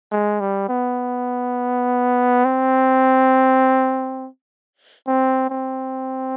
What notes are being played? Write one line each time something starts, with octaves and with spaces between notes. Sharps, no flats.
G#3
G3
B3
C4
C4
C4